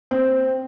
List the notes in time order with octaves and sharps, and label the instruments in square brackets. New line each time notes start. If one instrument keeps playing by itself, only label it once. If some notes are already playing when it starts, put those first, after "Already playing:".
[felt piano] C4